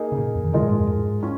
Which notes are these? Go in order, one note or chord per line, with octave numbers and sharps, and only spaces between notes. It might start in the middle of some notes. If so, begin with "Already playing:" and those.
Already playing: A#3 D#4 G#4
C#3
A#2
F2
D#3
C#3 F3 G#3 F4 A#4 D#5
A#2
G#2
F2
G#2
C#4 F4